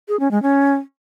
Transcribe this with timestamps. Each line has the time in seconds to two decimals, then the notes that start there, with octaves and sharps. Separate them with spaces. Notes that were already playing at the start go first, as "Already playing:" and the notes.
0.08 G#4
0.20 C#4
0.31 G#3
0.43 C#4